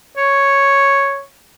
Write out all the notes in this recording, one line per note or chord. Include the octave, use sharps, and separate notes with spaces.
C#5